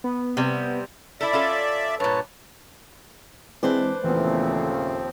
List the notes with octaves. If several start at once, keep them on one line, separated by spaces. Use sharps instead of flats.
B3
C3 G3
E4 A4 D5 E5
C#4 F4 A4
G2 A#2 B4 C#5 A5
E3 G#3 C4 D4 B4 C5 D5
D#2 A#2 C#3 E3 F3 A3 B3 C4